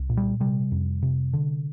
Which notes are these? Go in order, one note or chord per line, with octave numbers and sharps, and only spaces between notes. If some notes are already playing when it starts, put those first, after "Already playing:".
Already playing: C2
A#2
G3
C3 G3
F2
C3
D3